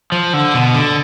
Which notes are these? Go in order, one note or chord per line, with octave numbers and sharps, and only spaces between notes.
F3
D3
B2
D3